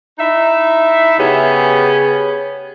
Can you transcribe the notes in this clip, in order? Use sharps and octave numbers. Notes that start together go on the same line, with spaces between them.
D#4 E4 E5
C#3 B3 C#4 G4 G#4